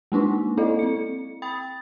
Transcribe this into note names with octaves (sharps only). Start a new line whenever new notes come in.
G#3 A#3 D4 D#4
C4 E4 A4 D5 D#5 F5
C4 C#7
G5 B5 D#6 A6